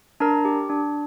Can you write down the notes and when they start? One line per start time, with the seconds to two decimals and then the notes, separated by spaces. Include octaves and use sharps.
0.20 D4 A#4 A#5
0.45 G4
0.70 D4